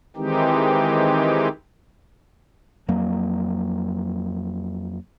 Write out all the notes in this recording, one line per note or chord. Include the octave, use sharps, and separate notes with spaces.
D#3 E3 G#3 C4 D#4 G4
F2 F#3 A#3